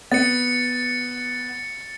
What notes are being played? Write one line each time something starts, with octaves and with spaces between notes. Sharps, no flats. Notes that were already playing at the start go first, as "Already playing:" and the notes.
B3 A6 C#7